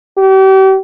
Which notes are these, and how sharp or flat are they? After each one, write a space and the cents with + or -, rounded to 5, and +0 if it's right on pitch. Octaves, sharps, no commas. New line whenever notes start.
G4 -40